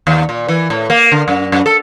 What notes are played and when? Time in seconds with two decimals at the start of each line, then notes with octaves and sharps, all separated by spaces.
0.07 D#2
0.29 A#2
0.48 E3
0.70 A2
0.90 A#3
1.12 D3
1.28 F#2
1.52 F#2
1.66 A4